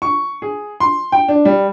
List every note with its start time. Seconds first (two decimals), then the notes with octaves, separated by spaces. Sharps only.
0.02 C#6
0.42 G#4
0.80 C6
1.12 G5
1.28 D4
1.45 G3